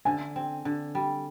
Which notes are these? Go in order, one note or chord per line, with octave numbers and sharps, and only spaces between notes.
D3 G#5
C4
D3
G3